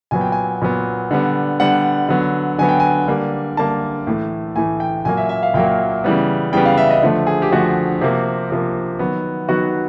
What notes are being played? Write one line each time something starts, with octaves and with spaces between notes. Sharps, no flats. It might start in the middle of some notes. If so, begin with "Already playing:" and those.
A#2 F#3 B3 G#5
G5
G#5
A#2 F#3 B3
D3 G3 B3
D3 G3 B3 F#5
D3 F#3 B3
D3 F#3 B3 G#5
G5
G#5
D3 G3 A#3
D3 G3 A#3 A5
A2 E3 A3
A2 E3 A3 G#5
G5
A#2 F#3 A#3 G#5
E5
E5
F5
A#2 F#3 A#3 G5
C#3 E3 G3 B3
C#3 E3 G3 B3 G5
F5
E5
D#5
D3 F3 A3
G#4
G4
D3 F3 A3 F#4
C3 F3 A#3
C3 F3 A#3
D#3 F#3 B3
D#3 F#3 B3 F#4